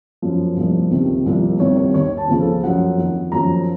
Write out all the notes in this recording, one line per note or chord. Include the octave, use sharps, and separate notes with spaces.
F#2 F3
C2 A#2 F3
C#2 C3 D#3
C2 A#2 F3
C2 C3 D#3 C#5
C#5
D#2 D#3 C#5
A5
C#2 C#3 F3 C5
A4
F#2 F3 F#5
F2 D#3
F#2 F3 A#5